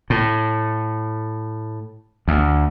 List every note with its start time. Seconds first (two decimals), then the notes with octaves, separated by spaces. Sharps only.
0.10 A2
2.28 D2